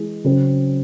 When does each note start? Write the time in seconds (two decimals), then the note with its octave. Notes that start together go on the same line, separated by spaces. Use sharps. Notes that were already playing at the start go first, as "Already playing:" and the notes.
Already playing: E3 G#3
0.24 C#3 F#3 C4